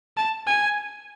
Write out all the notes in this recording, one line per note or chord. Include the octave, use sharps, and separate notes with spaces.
A5
G#5